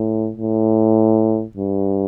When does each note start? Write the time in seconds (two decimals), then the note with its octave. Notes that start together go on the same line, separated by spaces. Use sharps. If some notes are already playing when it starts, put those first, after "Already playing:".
Already playing: A2
0.37 A2
1.57 G2